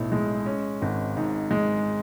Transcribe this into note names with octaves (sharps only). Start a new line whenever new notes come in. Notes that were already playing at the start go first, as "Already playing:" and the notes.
Already playing: B1 A2
G#3
C#4
G#1
G#2
G#3